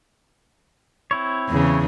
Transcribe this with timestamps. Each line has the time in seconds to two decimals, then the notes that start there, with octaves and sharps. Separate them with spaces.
1.11 C4 E4 C#5
1.49 E2 C#3